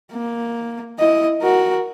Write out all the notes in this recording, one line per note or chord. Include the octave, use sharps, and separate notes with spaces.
A#3
E4 D#5
F#4 A#4